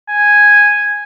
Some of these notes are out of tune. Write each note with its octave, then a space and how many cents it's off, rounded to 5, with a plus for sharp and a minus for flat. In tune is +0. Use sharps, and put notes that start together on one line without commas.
G#5 -5